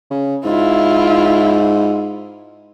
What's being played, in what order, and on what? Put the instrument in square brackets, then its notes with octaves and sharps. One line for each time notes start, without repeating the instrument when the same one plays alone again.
[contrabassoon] C#3
[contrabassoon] G#2 [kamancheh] E4 F4